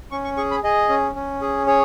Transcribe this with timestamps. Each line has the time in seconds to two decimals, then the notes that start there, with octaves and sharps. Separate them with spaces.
0.12 C#4 C#6
0.24 C#6
0.37 G#4 C#6
0.51 B5
0.64 G#4 D#5
0.89 C#4
1.15 C#4
1.42 G#4
1.67 G#4 C#5